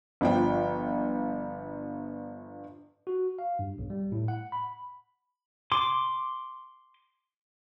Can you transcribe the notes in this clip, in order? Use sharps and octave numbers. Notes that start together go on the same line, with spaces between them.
G1 F3 G5
F#4
F5
G2
B1
G3
A2
F#5
B5
C6 D6